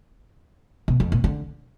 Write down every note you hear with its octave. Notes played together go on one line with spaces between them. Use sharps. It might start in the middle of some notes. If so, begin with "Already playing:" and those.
B2
F2
A#2
D3